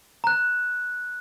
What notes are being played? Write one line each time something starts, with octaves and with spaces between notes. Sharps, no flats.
A#5 F#6